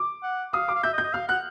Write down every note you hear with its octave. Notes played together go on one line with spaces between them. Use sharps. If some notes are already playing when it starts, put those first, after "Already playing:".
Already playing: D6
F#5
F5 D#6
D6
F5
E5 G6
D#5
G6
D#5
F5 F6
F#5 F#6